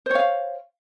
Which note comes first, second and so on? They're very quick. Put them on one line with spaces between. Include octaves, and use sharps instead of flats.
C5 C#5 F5